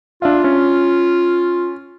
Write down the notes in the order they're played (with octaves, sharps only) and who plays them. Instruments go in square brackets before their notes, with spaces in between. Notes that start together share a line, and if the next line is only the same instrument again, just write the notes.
[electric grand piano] D4 E5 F5 [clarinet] F4
[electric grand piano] C#4